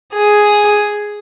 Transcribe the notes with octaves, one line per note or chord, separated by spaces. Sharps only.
G#4